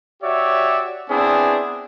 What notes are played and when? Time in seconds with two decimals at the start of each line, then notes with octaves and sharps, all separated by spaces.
0.22 F#4 G4 C#5 D5 E5
1.10 B3 C4 D4 E4 G#4